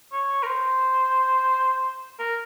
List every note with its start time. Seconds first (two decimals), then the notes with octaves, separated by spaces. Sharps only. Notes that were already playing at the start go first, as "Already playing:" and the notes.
0.12 C#5
0.43 A#4
0.47 C5
2.19 A#4